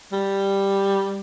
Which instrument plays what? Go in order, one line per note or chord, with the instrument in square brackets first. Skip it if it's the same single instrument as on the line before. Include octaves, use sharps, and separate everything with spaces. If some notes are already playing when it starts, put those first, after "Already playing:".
[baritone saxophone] G3